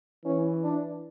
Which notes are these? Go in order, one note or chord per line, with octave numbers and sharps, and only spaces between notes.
E3 C#4
D4